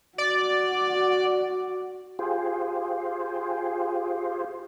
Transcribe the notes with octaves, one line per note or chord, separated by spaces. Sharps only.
F#4 D5
F4 G4 G#4 C5